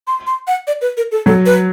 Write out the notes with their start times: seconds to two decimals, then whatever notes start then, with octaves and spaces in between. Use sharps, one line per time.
0.07 C6
0.27 C6
0.47 F#5
0.67 D5
0.81 B4
0.97 A#4
1.12 A4
1.26 F#3 A4
1.46 B4